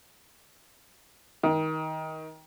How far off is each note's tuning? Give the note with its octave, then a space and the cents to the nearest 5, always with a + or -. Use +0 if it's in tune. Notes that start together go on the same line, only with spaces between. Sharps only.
D#3 +20